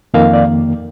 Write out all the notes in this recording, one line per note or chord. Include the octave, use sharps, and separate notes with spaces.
F2 D#3 A#3 F5
D5